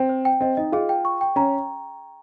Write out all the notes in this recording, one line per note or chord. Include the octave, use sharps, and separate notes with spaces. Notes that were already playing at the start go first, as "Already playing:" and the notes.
Already playing: C4 G5
C5
G5
C4 D#5
D#4 D#5
F4 G#4
G5
C#6
G5
C#4 A#5